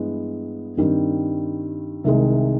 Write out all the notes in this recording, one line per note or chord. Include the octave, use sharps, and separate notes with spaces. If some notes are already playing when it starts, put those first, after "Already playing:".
Already playing: G2 E3 G#3 B3
G2 D#3 G3 C4
C2 C3 D#3 G#3